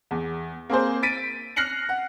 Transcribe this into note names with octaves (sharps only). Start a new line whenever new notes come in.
E2
A#3 C4 G#4 C5
A6 B6 D7 D#7
F6 F#6 A#6 C7 C#7 F#7
F#5